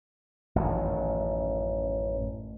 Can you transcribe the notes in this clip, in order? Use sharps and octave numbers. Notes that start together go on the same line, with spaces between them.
A1 F#2 D#3